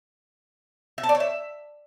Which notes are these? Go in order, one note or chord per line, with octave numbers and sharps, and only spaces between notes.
E5
A5
D5
C#5
E5